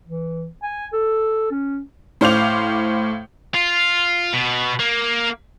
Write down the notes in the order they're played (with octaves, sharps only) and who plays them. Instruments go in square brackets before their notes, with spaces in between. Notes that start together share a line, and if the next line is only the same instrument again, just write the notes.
[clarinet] E3
G#5
A4
C#4
[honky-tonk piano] A2 C5 F5 D6 G6 F7
[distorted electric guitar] F4
B2
A#3